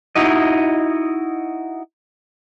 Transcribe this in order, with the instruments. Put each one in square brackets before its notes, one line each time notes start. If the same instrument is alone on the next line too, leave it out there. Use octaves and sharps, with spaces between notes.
[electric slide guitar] D#4 E4 F#4 D#5